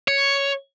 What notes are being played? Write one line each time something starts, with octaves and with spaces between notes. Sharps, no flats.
C#5